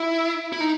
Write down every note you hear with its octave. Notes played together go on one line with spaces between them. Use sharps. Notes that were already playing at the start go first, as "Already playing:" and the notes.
Already playing: E4
E4
D#4